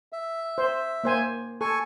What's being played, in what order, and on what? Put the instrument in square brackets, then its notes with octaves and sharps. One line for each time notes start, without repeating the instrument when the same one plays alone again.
[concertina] E5
[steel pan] C5
A#3 C5 G#5
[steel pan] A4 [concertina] G#5 C#6